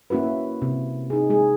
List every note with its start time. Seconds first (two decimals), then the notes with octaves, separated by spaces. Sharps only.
0.10 A#3 C#4 E4 F#4 B4
0.62 C3
1.10 D#4 G#4
1.30 G#3 G#4